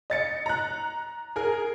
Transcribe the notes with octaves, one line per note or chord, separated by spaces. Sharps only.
D#5 A6 C#7
A#5 F#6
G#4 A#4